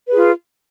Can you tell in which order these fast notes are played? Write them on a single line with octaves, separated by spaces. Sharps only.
B4 G#4 F4